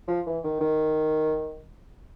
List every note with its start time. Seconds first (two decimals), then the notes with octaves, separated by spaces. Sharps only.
0.08 F3
0.26 E3
0.44 D#3
0.61 D#3